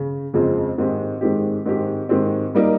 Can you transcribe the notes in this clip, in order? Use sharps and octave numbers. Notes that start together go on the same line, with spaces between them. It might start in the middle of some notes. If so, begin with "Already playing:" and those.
Already playing: C#3
F2 C#3 G#3 C4
G#2 D#3 G#3 C4 G4
G#2 D#3 G#3 C4 G4
G#2 D#3 G#3 C4 G4
G#2 D#3 G#3 C4 G4
G3 A#3 D#4 A#4